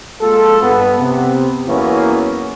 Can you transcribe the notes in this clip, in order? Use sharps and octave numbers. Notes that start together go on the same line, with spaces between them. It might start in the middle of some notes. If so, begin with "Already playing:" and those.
G#3 A#3 F4 A4
G2 B3
C3 B3
E2 E3 F#3 A#3 B3 C#4